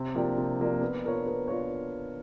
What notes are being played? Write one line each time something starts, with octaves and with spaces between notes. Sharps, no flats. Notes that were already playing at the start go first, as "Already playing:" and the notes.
Already playing: C3
F3 A#3 D4 G4
C3
F3 A#3 D4 G4
B3
D4 F4 A#4 C#5
B3
D4 F4 A#4 C#5